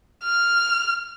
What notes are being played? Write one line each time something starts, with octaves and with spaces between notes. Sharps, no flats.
F6